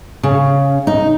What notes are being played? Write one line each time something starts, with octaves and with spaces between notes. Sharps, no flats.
C#3
D#4